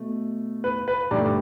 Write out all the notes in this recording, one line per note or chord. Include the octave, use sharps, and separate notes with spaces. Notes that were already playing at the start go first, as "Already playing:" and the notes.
Already playing: B2 A3
B4
B4
G2 D3 A3 D5